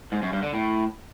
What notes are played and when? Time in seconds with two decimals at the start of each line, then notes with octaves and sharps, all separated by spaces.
0.12 G#2
0.22 F#2
0.32 G2
0.43 D3
0.53 A2